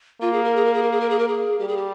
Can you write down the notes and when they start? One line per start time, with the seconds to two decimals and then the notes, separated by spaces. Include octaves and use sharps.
0.21 A#3 F4
0.33 G#4
0.44 A#4
0.56 G#4
0.65 A#4
0.74 G#4
0.82 A#4
0.92 G#4
1.01 A#4
1.10 G#4
1.19 A#4
1.28 G#4
1.59 G3 G4
1.68 G#4
1.77 G4